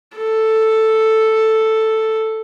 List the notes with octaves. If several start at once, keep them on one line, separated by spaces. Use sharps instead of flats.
A4